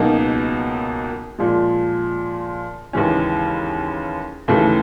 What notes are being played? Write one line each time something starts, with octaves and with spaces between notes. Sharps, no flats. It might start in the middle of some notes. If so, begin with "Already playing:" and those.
Already playing: C#2 B2 F#3 A#3 D#4
A#2 F3 G#3
D#2 C#3 E3 G#3 C#4
D#2 C#3 E3 A3